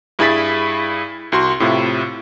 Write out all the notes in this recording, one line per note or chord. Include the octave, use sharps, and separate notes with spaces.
G2 E4 G#4 B5 A6 B6
C2 F#4 C6
A2 C3 E4 F4